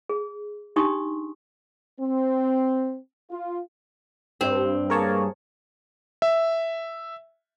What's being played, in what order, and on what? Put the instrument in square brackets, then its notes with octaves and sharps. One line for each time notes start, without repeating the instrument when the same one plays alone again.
[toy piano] G#4
D4 D#4 G4 C6 C#6 D#6
[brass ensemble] C4
F4
[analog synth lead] G2 [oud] C4
[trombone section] A#3 G#4 [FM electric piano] A#4 C#5 A5
[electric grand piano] E5